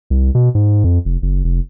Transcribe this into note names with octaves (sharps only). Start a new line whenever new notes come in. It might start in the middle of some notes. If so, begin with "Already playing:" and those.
C2
B2
G#2
F2
F1
F#1
F1